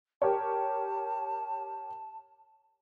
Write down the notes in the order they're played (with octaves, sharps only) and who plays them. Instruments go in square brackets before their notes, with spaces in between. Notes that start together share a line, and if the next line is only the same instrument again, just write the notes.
[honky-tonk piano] G4 A#4 C#5 [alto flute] A5